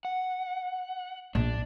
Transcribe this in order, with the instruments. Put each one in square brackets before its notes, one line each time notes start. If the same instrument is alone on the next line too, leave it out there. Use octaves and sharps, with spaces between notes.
[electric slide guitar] F#5
[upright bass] A#1 [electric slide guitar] D4